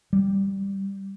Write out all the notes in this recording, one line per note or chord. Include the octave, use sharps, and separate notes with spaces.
G3